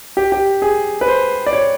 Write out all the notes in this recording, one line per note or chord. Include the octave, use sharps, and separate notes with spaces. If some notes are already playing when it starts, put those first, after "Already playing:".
G4
G4
G#4
B4
C5
D5
C#5